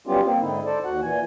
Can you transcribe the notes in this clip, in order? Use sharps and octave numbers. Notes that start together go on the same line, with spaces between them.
F#3 G3 B3 C#4 F4 G4
A#3 C4
G#2 D3 D#4 E4
A4 C5 D5
D#2 F#4 F#5
A#2 E3 G#5